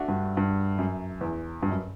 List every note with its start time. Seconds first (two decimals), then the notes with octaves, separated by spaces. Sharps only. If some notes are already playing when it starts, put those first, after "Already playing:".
Already playing: A3 D4 F#4
0.08 G2
0.37 G2
0.79 F#2
1.21 E2
1.62 G2
1.71 F#2